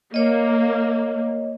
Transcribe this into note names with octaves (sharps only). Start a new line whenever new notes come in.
A#3 C#5 D#5